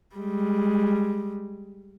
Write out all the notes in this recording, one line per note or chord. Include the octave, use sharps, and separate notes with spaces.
G3 G#3